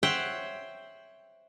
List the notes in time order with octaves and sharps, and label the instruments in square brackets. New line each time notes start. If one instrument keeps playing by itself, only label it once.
[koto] C5 C#5 E5 F#5 G5